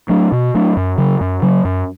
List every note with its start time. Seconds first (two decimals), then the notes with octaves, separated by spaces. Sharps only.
0.09 F#3 A3 D4
0.32 B2
0.55 F#3 A3 D4
0.77 F#2
0.98 C#3 F#3
1.21 F#2
1.42 C#3 F#3
1.65 F#2